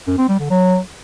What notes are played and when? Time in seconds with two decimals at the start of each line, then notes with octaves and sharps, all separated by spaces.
0.07 F#2
0.18 C4
0.29 G3
0.40 D3
0.50 F#3